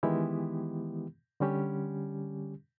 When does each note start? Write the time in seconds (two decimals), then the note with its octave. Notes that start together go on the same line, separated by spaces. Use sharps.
0.03 D#3 E3 G#3 B3 E4 G4
1.40 D3 G3 C#4 G4